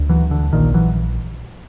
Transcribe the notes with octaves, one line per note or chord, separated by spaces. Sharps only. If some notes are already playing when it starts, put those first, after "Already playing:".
Already playing: D2
E3 F#3
D3
A#1 A#2 D#3
E3 F#3